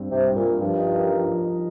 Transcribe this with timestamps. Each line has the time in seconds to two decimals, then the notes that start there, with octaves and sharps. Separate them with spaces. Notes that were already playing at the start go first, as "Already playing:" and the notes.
Already playing: G2 G3 C4
0.11 G2 C3
0.28 G2
0.36 A#2
0.45 G3
0.61 G2 F3
0.77 D#4
0.95 A#4
1.11 F3
1.28 F3
1.44 D#4